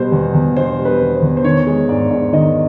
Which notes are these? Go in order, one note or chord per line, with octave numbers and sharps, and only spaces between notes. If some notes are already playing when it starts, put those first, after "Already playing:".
Already playing: B2 G3 C5
E2
E2
B2 C5
G3
B4
E2
C5
E2
C5
D#3 C#5
G#3
G#2 D5
G#2
D#3 D#5